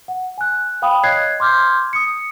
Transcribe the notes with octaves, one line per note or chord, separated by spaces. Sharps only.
F#5
G#5 F#6
F5 G5 B5 D#6
C#5 D#5 F#6 G#6 C7
C6 D6 F6 G6 G#6
D#6 C#7